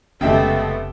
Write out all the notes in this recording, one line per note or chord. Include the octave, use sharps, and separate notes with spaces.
F1 C#3 G#3 A3 B3 G4 E5 G5